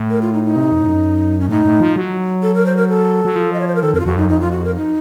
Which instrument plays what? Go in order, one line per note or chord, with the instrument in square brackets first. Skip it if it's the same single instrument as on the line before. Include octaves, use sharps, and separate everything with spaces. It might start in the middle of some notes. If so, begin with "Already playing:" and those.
Already playing: [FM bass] A2
[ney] A#4
F4
D#4
D#4
[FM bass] C3
F2
A2
F#2
[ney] C#4
[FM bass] A2 [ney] D#4
[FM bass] A2
F3
F#3
[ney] A4
A#4
C5
A#4
A4
[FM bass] F#3
F3
[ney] D#5
C#5
C5
A#4
[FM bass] D#3 [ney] A4
[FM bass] F2 [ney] A#4
[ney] F4
[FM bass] F2 [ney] F#4
[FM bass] F#2 [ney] D#4
[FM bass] F2 [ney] D#4
[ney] F4
F#4
A#4
D#4